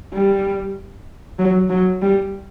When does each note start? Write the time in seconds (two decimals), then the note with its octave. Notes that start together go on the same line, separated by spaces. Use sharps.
0.13 G3
1.39 F#3
1.70 F#3
2.02 G3